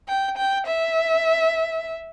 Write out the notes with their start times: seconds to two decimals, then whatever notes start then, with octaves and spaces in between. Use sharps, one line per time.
0.09 G5
0.37 G5
0.67 E5